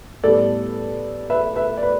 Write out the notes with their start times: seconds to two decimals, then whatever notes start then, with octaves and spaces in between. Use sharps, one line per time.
0.24 A2 G3 B3 A4 D5
1.30 B4 E5
1.56 B4 E5
1.77 D5
1.83 B4